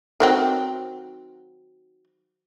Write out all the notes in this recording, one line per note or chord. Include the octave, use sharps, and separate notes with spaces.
D#3 F#3 C4